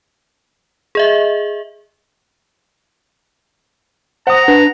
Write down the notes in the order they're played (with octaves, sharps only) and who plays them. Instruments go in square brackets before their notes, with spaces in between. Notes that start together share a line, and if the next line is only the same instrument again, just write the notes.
[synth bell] G#4 D#5 E5
[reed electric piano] C5 D#6 [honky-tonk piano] F#5 [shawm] A#5
[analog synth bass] D4 [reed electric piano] B4